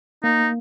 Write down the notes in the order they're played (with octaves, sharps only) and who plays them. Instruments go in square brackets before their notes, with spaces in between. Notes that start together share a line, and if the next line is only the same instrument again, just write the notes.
[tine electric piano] A#3 [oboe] D#4